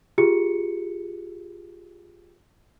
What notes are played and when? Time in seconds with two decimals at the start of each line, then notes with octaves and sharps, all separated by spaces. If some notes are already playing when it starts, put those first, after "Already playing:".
0.18 F4 G4 G#4 C#7